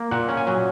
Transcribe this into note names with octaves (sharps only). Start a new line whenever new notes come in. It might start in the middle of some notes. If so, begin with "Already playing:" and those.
Already playing: A#3
A#2 F#5
C#4
G#5
F#3